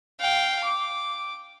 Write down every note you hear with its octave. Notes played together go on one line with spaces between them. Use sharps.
F5 G5
D6